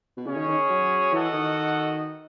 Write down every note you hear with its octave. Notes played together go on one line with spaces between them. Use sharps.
B2
C#3 C#4 G#4 C#5
D#3
D#3
F#3
E3 F#4 A4 D#5 F#5
D#3